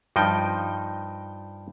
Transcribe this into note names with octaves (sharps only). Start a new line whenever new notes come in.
G2 F3 D#4 G5